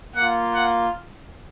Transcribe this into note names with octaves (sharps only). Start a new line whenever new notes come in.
A#3 F4 F#5
F#5